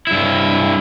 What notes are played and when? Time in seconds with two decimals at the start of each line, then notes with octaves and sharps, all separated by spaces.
0.07 G2 E4